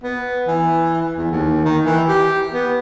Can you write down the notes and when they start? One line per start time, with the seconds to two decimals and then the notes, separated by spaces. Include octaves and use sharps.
0.03 B3
0.47 E3
1.17 E2
1.31 D#2
1.65 D#3
1.85 E3
2.08 G4
2.53 B3